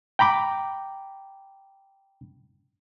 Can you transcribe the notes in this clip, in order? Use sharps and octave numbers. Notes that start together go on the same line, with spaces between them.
G5 A#5 B5 D6